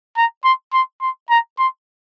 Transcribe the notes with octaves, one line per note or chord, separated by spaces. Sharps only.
A#5
C6
C6
C6
A#5
C6